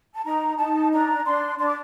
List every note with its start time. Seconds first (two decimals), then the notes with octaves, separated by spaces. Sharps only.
0.14 A5
0.25 D#4 A#5
0.58 D#4 A5
0.91 D4 A#5
1.25 D4 C6
1.58 D4 C6
1.67 D6